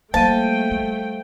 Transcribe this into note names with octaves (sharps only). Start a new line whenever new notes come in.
G3 A3 A#3 C5 F5 G5 A5 D#7
G3